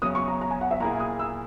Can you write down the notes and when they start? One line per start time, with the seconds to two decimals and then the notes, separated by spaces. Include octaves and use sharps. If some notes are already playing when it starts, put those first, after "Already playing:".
0.02 E2 C#3 F#3 D#6
0.15 C#6
0.28 A#5
0.41 A#5
0.51 G#5
0.61 F#5
0.71 E5
0.80 A#2 A#3 E4 G#4 A#5
1.00 D#6
1.19 E6